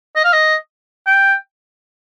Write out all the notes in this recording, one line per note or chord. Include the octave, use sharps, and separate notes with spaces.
D#5
F5
D#5
G5